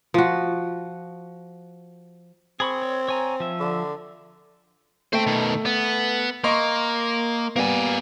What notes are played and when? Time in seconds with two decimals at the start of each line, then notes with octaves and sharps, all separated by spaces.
0.14 F3 F#4
2.60 C4 G#4 B5 C#6
2.82 C#5
3.08 C#5 G#5 A#5
3.40 F3 E5
3.60 D3
5.13 A3 C5 G5
5.27 B2 D#3
5.65 B3
6.44 A#3 D#5 C6 C#6
7.56 G3 A#3 B3 G#5